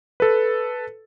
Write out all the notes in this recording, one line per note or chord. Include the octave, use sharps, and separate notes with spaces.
A4 B4